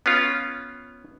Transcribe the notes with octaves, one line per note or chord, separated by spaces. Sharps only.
B3 C#4 F4